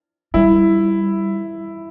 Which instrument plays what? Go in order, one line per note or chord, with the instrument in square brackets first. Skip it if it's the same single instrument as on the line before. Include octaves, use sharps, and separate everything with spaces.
[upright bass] G3 [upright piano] E4